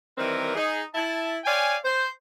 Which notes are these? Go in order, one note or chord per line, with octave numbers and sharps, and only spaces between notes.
D#3 E3 G3 C4 A#4
D#4 G#4
E4 A5
C#5 D5 F5 G5 G#5
C5